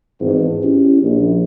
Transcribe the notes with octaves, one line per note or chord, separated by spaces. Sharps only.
G#1 E2 G#2
C#4 E4 G4
A#1